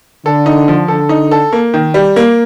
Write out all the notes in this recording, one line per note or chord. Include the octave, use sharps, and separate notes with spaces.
D3 A4
D#4
F3
D3 A4
D#4
A4
A#3
D#3
G3
A#3